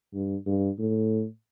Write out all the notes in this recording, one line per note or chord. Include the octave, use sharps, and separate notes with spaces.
G2
G2
A2